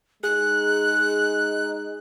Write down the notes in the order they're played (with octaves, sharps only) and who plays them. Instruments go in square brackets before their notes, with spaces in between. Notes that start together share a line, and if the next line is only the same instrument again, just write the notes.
[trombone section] G#3 D#4 [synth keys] G#4 [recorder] F#6